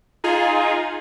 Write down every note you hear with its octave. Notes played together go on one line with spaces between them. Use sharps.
D#4 F4 G#4